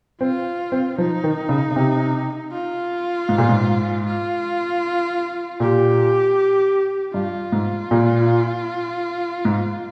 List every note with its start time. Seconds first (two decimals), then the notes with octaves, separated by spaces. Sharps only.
0.21 C4 F4
0.72 C4
0.98 F3 D#4
1.24 D#3
1.49 C#3
1.71 C#3
1.76 C3
2.52 F4
3.29 G#2
3.38 A#2
3.49 G#2
4.06 F4
5.60 A#2 G4
7.14 G2 F4
7.52 G#2
7.91 A#2
9.45 G#2